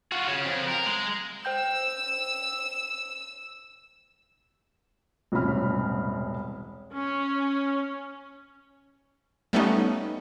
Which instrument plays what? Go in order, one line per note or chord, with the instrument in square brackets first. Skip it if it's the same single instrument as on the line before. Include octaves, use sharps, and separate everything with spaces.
[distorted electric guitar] F4 F#4
C#3 C#4
F2
A#4
G#3
[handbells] C5 G5 G6 [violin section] E6
[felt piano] E1 C2 A2 C#4 B5 F6
[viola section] C#4
[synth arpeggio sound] G3 A3 B3 C#4 D#4